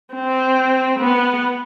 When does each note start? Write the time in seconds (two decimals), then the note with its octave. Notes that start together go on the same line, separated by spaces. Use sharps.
0.14 C4
0.99 B3